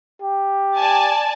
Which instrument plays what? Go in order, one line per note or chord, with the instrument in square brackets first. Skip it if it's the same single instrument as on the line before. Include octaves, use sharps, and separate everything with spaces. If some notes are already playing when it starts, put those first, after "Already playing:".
[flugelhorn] G4
[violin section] D5 G#5 A5